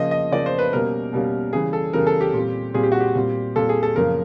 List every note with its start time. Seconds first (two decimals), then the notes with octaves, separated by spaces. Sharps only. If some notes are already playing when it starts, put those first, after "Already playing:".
Already playing: C#3 F3 A#3 D#5
0.11 D#5
0.31 C#3 F3 A#3 D5
0.46 C5
0.59 B4
0.73 B2 G3 A#3 C#4 A#4
1.13 B2 G3 A#3 C#4
1.53 C#3 E3 G3 G#4
1.73 A4
1.93 C#3 E3 G3 A#4
2.07 A4
2.21 G4
2.34 A#2 G3 C4
2.74 A#2 G3 C4 G#4
2.83 G4
2.92 F#4
3.00 G4
3.15 A#2 G3 C4
3.55 A#2 G3 C4 A4
3.69 G#4
3.83 A4
3.96 F#2 C#3 F3 A#3 A#4